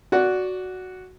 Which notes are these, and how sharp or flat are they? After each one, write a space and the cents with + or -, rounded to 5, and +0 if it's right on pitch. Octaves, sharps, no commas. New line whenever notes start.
F#4 +0 D5 -15 F#5 +0